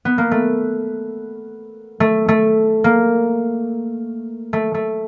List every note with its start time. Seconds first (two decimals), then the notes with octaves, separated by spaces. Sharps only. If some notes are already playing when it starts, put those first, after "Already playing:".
0.05 B3
0.18 A#3
0.31 A3
2.00 A3
2.28 A3
2.84 A#3
4.53 A3
4.74 A3